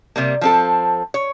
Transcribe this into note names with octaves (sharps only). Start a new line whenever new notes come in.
C3 G3 A#3
F3 C4 A4
C#5